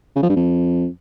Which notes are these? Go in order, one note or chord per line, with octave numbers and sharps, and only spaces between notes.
C#3
F3
G2
F2